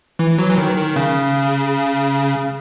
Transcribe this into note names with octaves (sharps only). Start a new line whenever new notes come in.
E3
F#3
E3
D#3
D#3
C#3